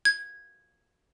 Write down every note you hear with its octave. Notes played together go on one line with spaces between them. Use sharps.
G#6